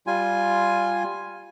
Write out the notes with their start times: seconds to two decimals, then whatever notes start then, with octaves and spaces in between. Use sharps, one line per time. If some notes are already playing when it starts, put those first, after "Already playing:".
0.07 G3 F4 G#5